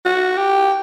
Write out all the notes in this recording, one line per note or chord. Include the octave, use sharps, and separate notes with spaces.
F#4
G4